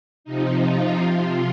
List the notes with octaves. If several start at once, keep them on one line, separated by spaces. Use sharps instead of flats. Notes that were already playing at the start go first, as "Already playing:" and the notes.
C3 F3 D#4
F4
C3 F3